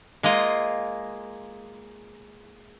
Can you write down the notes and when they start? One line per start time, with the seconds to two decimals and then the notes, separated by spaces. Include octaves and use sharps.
0.23 G#3 A#3 F4 D#5